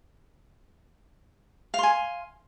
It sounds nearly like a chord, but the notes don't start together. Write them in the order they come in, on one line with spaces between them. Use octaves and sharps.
F5 C6 G#5